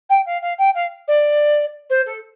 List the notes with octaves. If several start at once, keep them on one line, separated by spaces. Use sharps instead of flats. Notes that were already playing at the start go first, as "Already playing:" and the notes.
G5
F5
F5
G5
F5
D5
C5
A4